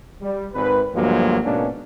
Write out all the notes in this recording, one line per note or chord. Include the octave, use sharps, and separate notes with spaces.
G3
G#1 B4
D2 G2 F3 F#3 G#3 A#3
G#2 B2 A#3 B3 C#4 D4